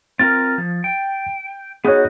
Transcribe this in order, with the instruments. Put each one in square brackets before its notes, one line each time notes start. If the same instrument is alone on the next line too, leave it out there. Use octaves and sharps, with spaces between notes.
[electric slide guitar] C4 F4 A#4 [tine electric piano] A6
[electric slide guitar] F3
G5
[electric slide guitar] B3 D#4 F#4 [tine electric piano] G#4 C#5